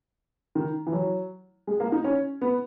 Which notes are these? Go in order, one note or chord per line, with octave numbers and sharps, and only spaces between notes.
D#3
E3
F#3
G#3
A#3
D#4
C#4
B3